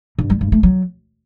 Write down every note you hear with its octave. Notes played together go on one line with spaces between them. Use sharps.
G2
G3
G2
A3
F#3